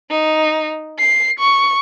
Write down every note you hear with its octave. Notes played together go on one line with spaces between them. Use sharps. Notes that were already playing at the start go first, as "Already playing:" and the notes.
D#4
C7
C#6